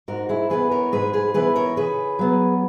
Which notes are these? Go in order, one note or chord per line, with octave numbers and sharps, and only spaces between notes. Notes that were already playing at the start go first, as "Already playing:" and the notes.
G#2 F#4 A#4
E4 G#4
E3 B3 G#4 B4
A#4 C#5
G#2 G#4 B4
G#4 B4
E3 B3 G#4 B4
A#4 C#5
C#3 G#4 B4
F#3 B3